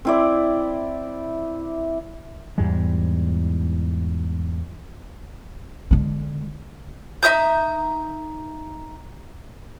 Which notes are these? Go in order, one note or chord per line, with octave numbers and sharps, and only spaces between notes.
C4 E4 D5
E2 G#2 G3 G#3
D3 G#3
D#4 E5 D#6 G6